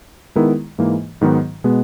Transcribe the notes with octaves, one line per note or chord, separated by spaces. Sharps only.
D#3 G#3 B3 E4 A#4
G#2 E3 A#3
G#2 D#3 F#3 B3 D#4
B2 G#3 B3